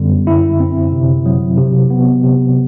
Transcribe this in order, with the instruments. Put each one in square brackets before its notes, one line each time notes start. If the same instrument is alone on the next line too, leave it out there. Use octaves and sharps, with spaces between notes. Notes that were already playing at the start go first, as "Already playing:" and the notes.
Already playing: [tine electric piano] F#2 D3 G3 B3
E4
C4
C3
F#3
C3
B3
C3